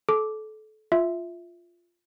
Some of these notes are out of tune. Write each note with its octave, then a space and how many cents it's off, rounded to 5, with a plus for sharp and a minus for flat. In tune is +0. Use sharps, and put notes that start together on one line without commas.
A4 -25 D6 +0
F4 +0 E5 +0